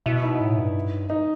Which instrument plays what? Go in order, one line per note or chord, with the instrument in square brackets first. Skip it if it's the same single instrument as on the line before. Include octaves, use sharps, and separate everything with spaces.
[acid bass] B2 [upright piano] E4
[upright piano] D#4
[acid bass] A2
G2
[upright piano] D#4